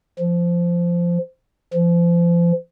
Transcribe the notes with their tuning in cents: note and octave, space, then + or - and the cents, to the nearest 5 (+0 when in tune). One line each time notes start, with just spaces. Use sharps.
F3 -15
F3 -35